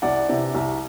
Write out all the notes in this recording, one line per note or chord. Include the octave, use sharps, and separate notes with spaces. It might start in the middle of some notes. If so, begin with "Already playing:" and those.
C2 D5 F#5
C3 E3
C2